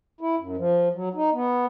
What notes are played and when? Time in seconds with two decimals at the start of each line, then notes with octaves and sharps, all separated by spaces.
0.21 E4
0.38 F#2
0.57 F3
0.93 F#3
1.14 D#4
1.33 B3